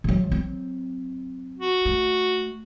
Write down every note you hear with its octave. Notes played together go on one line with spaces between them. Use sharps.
C3 F#3
F#3 C4
F#4
A3